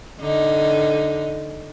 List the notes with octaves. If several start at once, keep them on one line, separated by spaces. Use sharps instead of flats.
D3 D#4